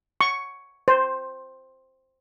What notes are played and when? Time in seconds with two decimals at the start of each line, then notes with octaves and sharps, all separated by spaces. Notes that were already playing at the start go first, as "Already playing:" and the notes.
0.21 C#6
0.88 C5